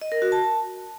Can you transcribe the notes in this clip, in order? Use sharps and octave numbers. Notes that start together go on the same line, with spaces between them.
D#5
A#4
F#4
A5